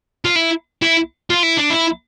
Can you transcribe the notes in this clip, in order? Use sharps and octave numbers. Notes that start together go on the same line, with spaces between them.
F4
E4
E4
F4
E4
D4
E4